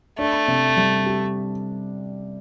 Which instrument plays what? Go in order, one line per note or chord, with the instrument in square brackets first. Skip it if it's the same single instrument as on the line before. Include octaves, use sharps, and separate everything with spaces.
[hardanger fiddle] A3 [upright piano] D4
[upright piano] C3
G3
G4